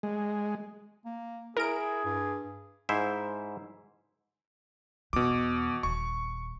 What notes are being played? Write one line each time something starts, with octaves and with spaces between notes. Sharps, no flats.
G#3
A#3
E4 G#4 A#4 D7
G2
G#2 E4 C5 E5
E2 B2 D6
D#1 C#6